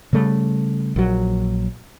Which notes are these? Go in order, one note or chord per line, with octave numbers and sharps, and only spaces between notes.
C#3 G3 A3
A#1 F#3